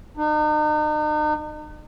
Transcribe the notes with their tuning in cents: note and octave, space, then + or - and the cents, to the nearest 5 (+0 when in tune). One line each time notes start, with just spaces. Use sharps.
D#4 -40